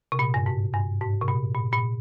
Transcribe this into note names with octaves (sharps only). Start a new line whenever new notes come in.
C3
A#2
G2
G#2
G2
G#2
C3
A#2
A#2
A#2